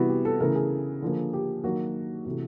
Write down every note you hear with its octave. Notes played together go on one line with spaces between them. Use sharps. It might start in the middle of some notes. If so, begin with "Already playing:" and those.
Already playing: C3 E3 G3 B3 E4 F#4
G4
A4
C#3 E3 A3 A#4
G#4
D3 F3 A#3
G4
D#3 F#3 A#3 F#4
C3 E3 A3 F#4